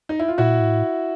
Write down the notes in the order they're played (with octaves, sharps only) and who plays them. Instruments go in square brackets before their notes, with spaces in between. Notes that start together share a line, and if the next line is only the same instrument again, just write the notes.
[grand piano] D#4
E4
F4
[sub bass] A#2 [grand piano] E4 F#4
[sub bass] A2